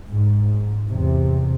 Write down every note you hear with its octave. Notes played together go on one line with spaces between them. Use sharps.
G#2
E2 C3